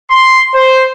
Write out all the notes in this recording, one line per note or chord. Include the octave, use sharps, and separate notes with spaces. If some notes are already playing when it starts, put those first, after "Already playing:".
C6
C5